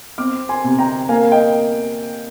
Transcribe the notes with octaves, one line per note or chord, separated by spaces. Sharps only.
C4 D6 F6
G#5 C6
C3
G5 A#5
A#3 F5 G#5
D#5 G5